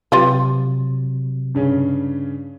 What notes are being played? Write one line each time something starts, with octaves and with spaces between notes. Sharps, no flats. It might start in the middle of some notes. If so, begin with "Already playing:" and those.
C3 F#3 F4 G4 B4
G2 C#3 C#4